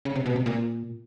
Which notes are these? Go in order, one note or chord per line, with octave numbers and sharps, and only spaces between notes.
C#3
C3
B2
C3
A#2